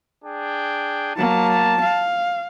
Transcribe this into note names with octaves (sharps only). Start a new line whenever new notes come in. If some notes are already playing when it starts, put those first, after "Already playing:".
D4 G#4 G5
F#3 A#3 A5
F5